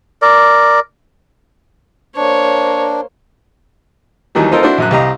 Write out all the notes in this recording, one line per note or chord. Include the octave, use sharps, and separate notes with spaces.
A#4 D5
A#3 D4 C5 C#5
D#2 D#3 E3 F#3 G3
C4 D#4 F4 A4 A#4 C5
D4 E4 F#4 C5
A#1 F#2 F#6
C2 G4 D#5 F5 A#5